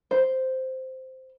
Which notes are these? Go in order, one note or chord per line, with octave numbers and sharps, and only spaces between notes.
C5